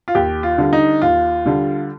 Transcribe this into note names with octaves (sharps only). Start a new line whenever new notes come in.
F4
D#2 G4
F4
D3 G3
D#4
D#2 F4
D3 G3